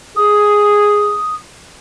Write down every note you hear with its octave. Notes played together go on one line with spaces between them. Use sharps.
G#4 D#6